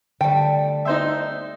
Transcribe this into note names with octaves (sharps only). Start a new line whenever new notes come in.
D3 G3 A3 G5
D#4 C5 E5